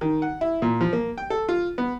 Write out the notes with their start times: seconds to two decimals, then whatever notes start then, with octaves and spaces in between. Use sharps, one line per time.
0.01 D#3
0.22 F#5
0.41 E4
0.62 A#2
0.81 F3
0.93 A#3
1.18 G5
1.30 A4
1.49 F4
1.78 B3